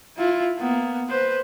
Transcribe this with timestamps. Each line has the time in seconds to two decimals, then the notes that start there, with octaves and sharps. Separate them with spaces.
0.17 E4 F4
0.59 A#3 B3
1.09 B4 C5